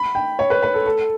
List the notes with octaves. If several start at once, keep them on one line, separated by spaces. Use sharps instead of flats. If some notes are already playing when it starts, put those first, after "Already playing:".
Already playing: B5
G5
C#5
B4
B4
A4
A4